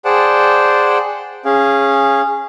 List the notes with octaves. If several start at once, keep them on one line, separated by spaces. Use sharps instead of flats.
G#4 C5 D5 F#5 G5 A5
C#4 G#4 F5